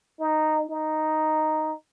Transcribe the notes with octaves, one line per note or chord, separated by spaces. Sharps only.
D#4
D#4